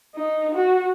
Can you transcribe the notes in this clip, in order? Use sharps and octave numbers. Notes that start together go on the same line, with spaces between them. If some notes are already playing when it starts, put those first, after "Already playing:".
D#4
F#4